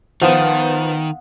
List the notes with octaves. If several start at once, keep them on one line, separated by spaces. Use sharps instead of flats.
D#3 F3 B3 F5 F#5 D#6